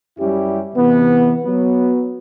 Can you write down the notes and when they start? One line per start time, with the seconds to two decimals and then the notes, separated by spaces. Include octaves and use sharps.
0.19 F#2 G3 C#4 E4 G4
0.76 C3 E3 B3
1.45 F#3 B3